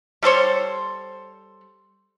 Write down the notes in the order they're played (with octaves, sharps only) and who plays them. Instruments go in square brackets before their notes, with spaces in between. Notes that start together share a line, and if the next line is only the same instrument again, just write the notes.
[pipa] G3 A4 C5 C#5